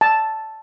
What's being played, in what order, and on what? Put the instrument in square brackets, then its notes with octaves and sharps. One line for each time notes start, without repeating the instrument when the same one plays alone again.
[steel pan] A5